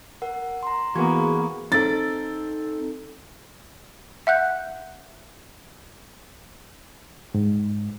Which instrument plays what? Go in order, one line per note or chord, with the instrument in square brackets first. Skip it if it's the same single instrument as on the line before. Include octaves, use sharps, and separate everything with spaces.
[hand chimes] A#4 F#5
A#5 C6
[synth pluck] E3 G#4 [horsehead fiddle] A#3 B3 [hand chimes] F#4 C#6 G#6
[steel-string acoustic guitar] C4 [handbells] D#4 A4 [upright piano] A6
[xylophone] E5 F#5 F#6 G6
[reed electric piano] G#2